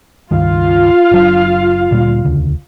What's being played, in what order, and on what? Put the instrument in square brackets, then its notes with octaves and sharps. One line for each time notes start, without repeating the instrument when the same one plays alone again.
[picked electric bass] C#2 G2 D#3 [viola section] F4 F5
[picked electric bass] F#1 F#3 D4
D2 A#2 G3
E1 D2 C#3